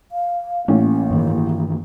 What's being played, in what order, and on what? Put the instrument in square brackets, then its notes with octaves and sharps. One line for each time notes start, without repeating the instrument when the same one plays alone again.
[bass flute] F5
[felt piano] A1 [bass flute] A#3 [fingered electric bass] C#4
[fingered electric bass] G2 D#3 E3